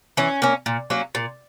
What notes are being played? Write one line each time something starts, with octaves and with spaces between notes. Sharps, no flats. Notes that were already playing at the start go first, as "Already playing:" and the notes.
E3 C#4
A#3 C#4
A#2
F#3 A#3 C#4
A#2